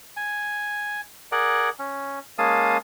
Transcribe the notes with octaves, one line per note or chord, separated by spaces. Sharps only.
G#5
G#4 A#4 D5 F#5
C#4
G#3 A#3 C#4 F5 A5 D#6